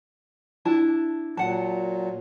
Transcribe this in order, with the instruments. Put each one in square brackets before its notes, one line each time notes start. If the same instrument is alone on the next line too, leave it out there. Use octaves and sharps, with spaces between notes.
[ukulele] D4 E4 A5
[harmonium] A#2 F#3 [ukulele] F#5 A5